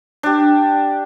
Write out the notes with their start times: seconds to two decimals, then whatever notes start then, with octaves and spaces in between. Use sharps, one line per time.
0.23 D4 G4